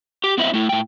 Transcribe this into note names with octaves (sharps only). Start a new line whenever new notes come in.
G4
B3 C4 E4 D#5 E5
A3 E4
A2 G5